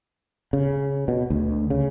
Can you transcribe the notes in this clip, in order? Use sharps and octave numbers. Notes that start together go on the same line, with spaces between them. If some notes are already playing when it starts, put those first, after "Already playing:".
C#3
B2
D2
C#3